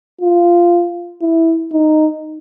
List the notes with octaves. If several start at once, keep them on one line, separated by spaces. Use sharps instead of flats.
F4
E4
D#4